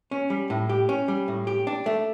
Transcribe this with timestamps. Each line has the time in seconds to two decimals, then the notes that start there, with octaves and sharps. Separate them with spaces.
0.11 C#4
0.30 G3
0.50 A2
0.69 G4
0.89 C#4
1.08 G3
1.28 A2
1.47 G4
1.67 D4
1.86 A3